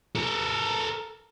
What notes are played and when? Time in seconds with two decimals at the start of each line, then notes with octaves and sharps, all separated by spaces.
0.15 A4 A#4